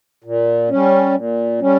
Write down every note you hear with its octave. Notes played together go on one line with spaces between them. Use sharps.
A#2
G3 C#4
A#2
G3 C#4